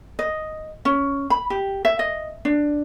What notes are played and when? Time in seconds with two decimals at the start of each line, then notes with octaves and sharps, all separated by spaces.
0.19 D#5
0.85 C#4
1.30 B5
1.50 G4
1.85 E5
1.99 D#5
2.45 D4